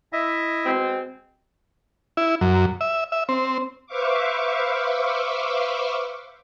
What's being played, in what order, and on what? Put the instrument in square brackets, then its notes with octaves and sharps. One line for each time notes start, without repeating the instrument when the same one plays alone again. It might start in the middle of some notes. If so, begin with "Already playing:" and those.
[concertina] E4 D#5 E5
[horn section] B2 G#3 C4
[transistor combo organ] E4
F#2
E5
E5
C4
[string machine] B4 C5 E5 F5 C#6 D6